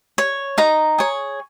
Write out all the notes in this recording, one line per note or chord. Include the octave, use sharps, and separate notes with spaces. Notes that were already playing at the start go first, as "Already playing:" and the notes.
C#5
D#4 A#5
G#4 C#5